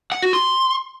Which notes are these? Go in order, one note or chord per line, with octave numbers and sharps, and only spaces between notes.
F#5
F#4
C6